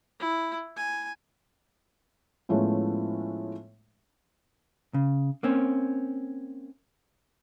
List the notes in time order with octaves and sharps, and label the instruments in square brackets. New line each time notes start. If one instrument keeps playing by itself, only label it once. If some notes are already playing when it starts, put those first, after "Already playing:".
[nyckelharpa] E4
G#5
[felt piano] A2 F3 G#3 A3 B3 C#4
[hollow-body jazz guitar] C#3
A#3 C4 C#4